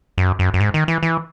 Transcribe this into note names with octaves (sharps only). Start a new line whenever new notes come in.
F#2
F#2
F#2
G#2
D#3
E3
E3